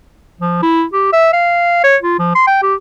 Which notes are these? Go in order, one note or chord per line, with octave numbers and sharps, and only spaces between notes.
F3
E4
G4
E5
F5
C#5
F4
F3
C6
G5
G4